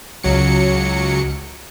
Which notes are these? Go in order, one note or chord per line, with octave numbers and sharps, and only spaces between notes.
C#2 F#3 C#7